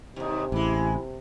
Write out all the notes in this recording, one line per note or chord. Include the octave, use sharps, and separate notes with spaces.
D#2 G#2 C3 D#4
A1 E3 G#3 E4